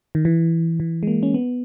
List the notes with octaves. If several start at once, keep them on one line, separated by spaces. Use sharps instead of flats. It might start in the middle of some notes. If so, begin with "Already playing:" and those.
D#3
E3
E3
G#3
A#3
C#4
B3